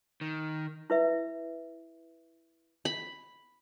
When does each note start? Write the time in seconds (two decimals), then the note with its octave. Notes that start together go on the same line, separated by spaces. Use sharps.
0.21 D#3
0.90 E4 B4 E5
2.85 B5